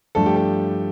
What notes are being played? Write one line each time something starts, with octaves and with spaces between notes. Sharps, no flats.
G2 F3 A3 D4 A4
G4
A4